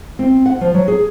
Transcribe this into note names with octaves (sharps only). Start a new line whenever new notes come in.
C4
F#5
F3
F#3
G#4